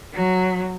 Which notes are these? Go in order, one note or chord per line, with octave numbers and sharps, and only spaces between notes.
F#3